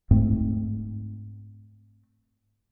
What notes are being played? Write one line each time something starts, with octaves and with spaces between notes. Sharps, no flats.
G#2 A3 C4